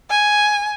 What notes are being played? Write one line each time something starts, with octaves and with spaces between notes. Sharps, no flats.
G#5